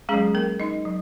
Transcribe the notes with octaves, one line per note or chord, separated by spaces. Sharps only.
F#3 G#3 C#4 G#4
A#3 A#4
D#4 D#5
F#3